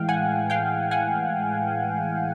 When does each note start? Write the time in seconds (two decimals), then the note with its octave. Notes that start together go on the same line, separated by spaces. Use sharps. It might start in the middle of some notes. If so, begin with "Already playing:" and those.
Already playing: A2 E3 G#3 F5 G5
0.09 F#5 G#5
0.50 F5 G5
0.91 F#5 G#5